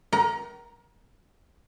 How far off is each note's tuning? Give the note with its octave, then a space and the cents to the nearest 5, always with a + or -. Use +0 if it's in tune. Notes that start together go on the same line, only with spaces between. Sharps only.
A#4 +35 G5 -40 A#5 +5